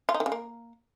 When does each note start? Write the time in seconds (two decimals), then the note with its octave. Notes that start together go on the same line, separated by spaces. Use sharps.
0.09 F4
0.14 D#4
0.20 D#3
0.26 C#3
0.32 A#3